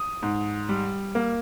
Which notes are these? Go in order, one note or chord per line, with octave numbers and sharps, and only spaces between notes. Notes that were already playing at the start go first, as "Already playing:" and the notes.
Already playing: D#6
G#2
G3
A#3